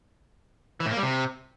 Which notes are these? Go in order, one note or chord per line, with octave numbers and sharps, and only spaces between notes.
E3
A2
A#3
G3
C3